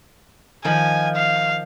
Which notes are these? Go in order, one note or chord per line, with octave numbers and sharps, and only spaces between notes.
D#3 F3 G#5
F5